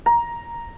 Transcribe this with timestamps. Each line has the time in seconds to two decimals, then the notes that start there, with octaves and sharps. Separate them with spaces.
0.06 A#5